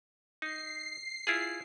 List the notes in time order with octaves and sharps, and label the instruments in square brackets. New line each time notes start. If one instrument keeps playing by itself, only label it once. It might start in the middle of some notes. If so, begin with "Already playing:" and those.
[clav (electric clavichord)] D#4 [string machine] C7
[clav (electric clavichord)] E4 F4 G#4